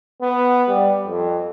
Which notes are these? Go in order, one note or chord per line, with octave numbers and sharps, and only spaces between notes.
B3
G3
F2